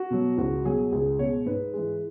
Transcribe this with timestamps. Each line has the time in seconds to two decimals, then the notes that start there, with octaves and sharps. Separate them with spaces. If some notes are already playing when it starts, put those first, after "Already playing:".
Already playing: F#4
0.10 B2 F#3
0.38 C#2 F#4
0.65 B2 F#3 G#4
0.92 C#2 G#4
1.19 B2 G#3 C#5
1.46 G#2 B4
1.74 E3 G#3